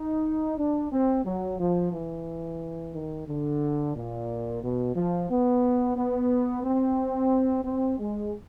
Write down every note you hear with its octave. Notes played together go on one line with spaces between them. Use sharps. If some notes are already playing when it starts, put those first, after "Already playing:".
Already playing: D#4
D4
C4
F#3
F3
E3
D#3
D3
A#2
B2
F3
B3
B3
C4
C4
G#3